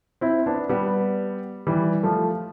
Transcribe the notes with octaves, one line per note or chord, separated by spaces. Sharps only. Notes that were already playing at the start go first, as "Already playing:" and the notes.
C4 E4
B3 D4
G3 B3
E3 G3
F3 A3